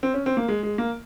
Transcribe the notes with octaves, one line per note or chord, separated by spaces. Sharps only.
C4
C#4
C4
A#3
G#3
G#3
A#3